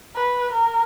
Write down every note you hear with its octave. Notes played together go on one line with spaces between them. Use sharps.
B4
A#4